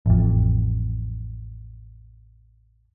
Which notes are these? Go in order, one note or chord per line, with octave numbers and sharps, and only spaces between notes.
A1 F2